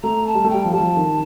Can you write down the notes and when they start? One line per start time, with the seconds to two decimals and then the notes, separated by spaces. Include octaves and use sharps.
0.03 A3 A#5
0.27 A5
0.35 G3
0.44 A3
0.50 G3 G5
0.65 F3
0.73 G3 A5
0.80 F3
0.97 D#3